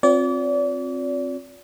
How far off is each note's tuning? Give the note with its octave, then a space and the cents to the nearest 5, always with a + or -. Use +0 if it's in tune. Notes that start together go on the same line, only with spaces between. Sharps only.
C4 +10 F4 +30 D5 -35